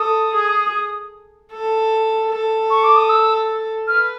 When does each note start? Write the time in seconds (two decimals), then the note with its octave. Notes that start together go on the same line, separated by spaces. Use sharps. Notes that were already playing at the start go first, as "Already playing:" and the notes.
Already playing: A4 D#6
0.33 G#4
1.52 A4
2.31 A4
2.70 C#6
2.84 D6
2.96 D#6
3.09 E6
3.88 B4 F6